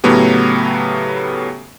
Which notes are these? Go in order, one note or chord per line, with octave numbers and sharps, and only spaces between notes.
A2 C#3 F#3 A3 B3 G4